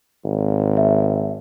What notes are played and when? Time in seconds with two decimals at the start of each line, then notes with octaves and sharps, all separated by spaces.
0.24 G#1
0.77 E5